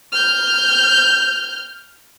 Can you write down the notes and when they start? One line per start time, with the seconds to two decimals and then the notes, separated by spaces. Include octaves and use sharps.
0.12 F6 G6